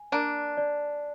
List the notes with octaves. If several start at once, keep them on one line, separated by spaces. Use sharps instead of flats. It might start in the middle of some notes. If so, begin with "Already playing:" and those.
Already playing: G#5
A#3 D4 D5
D5